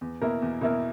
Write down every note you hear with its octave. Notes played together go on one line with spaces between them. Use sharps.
E2
B2 A#3 E4 A#4
E2
B2 A#3 E4 A#4